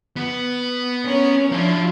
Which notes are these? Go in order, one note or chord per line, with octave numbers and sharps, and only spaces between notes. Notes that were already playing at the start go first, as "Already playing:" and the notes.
B3
C#4 A#4 C#5
F3 D4 E4 F4